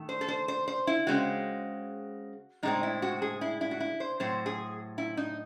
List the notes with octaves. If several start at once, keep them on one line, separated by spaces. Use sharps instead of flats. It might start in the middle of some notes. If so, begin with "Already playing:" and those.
Already playing: D#3 A3
C5
A4
C5
C5
C5
E4
C#3 G#3 C4 F#4
A2 G#3 C4 D#4
E4
F#4
G#4
E4
E4
F#4
E4
C5
A2 F#3 C4 C5
G#4
E4
D#4